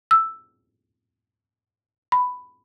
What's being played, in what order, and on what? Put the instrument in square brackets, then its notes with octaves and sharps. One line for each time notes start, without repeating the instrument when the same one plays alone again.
[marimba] E6
B5